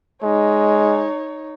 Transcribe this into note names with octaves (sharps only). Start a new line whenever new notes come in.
G#3 D#4 C#5